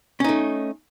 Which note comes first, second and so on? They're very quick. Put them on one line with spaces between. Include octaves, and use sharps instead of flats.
C#4 D#4 A3